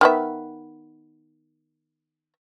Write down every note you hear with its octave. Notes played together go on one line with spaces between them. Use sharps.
D#3 B3 E5